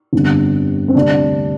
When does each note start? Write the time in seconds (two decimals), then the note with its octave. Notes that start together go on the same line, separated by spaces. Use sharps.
0.13 G1 F2 D3 G3
0.88 C4
0.95 D2 C3 G3 D4